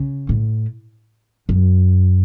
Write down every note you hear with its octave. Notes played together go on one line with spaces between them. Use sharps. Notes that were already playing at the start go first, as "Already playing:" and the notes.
Already playing: C#3
A2
F#2